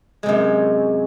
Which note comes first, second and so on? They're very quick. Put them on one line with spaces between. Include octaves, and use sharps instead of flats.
G#3 C3 F#2